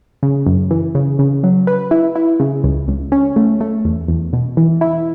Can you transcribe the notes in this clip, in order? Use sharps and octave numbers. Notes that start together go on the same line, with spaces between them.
C#3
F#2
E3
C#3
C#3
F#3
B4
E4
E4
C#3
C#2
C#2
C#4
A3
A3
E2
E2
B2
E3
E4